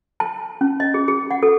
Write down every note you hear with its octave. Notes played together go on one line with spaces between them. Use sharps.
A5
C#4
D#5
G#4
G#4
F#5
A4